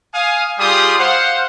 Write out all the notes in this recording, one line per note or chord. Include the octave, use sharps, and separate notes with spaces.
F5 G#5 D#6
G3 F4 G4 G#4 C6 D#6
C5 F5 F#5